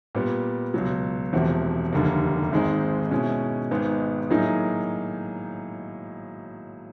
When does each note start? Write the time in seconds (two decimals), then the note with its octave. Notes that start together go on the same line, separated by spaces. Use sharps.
0.15 A#2 G3 B3
0.74 C#2 B2 F#3
1.33 E1 E2 C3 F3 A3
1.93 F1 D#2 D3 G3 A#3
2.52 G#1 G#2 D#3 G#3 C4
3.11 B2 G#3 C#4 E4
3.71 G#1 G#2 D#3 G#3 B3
4.30 A2 F#3 A#3 D#4 G#4